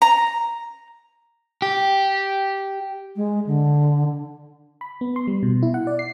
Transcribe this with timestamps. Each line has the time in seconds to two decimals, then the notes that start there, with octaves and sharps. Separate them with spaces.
0.02 A#5
1.62 G4
3.16 G#3
3.46 D3
4.81 B5
5.01 B3
5.16 C6
5.27 G3
5.43 B2
5.63 E4
5.74 F#5
5.87 D5
5.99 C7